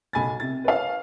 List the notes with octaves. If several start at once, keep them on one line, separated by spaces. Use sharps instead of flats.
B1 G#5 B5 A6
C3 A6
B4 C#5 F5